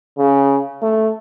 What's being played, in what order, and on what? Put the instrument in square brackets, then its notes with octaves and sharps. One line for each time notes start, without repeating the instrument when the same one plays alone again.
[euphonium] C#3
A3